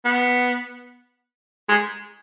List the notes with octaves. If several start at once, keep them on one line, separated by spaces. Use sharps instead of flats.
B3
G#3